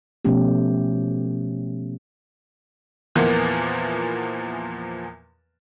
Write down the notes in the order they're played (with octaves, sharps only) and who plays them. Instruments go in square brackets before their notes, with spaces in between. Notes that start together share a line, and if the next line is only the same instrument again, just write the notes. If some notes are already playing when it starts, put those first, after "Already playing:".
[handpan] B2 F3 A3 B3 C#4 G4
[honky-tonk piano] E2 A#2 E3 F3 A#3 B3